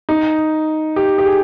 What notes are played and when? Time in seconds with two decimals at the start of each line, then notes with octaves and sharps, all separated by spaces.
0.09 D#4
0.96 G4
1.18 G4
1.25 G#4